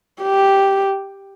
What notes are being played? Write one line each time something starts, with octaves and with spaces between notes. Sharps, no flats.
G4